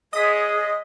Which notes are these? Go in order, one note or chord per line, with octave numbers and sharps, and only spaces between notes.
G#3 G#4 D#5 D#6 B6